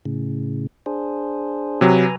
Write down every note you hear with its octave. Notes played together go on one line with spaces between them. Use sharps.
A2 C#3
D4 G#4 C5
C3 F#3 B4 G#5 A#5